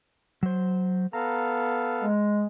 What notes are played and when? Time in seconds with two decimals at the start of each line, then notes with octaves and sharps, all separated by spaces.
0.43 F#3 C5
1.13 B3 A4 F5 A#5
2.02 G#3